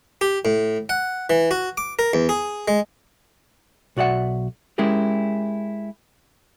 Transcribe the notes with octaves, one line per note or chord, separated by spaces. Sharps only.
G4
A2
F#5
E3
F#4
D6
A#4
E2
G#4
G#3
B1 F#4 D5 E5 F#5
G#3 C#4 E4 G4 G#4 A#4